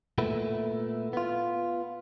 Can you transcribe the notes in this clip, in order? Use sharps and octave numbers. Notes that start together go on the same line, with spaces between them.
A#2 A3 B3 E4
B3 F4